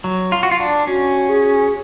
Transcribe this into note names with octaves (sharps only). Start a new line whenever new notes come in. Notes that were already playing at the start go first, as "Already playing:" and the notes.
F#3
F4
F#4
F4
D4
C#4 F#4
G#4